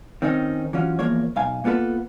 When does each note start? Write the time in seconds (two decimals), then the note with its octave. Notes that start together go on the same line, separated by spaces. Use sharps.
0.22 D#3 C4 C#4 D#4
0.73 E3 F#3 C#4 F4
0.99 E2 F3 A#3 C#5
1.36 B1 F5 G#5
1.64 A#3 B3 F4 A4 B4